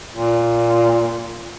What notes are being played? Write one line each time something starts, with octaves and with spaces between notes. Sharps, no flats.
A#2